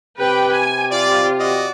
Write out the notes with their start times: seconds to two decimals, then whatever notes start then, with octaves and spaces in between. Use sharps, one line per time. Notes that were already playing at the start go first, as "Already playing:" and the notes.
0.19 C3 G4 B4 G5
0.54 G#5
0.91 F4 D5
1.39 F#4 D5 D#5